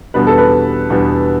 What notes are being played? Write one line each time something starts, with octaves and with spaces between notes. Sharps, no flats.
E2 B2 G3 B3 D4 B4
A4
B4
E2 B2 G3 B3 D4